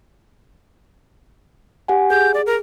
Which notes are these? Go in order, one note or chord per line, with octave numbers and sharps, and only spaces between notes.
G4 F#5 G#5
G#4 G6
D5
A#4